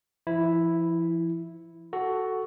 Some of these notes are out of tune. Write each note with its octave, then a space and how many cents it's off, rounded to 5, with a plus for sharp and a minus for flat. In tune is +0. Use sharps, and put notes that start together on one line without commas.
F3 -45 E4 +0
F#4 +10 A4 +0